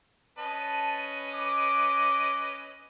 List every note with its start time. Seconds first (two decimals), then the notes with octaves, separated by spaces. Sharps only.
0.38 C#4 B4 D#5 A5
1.35 D6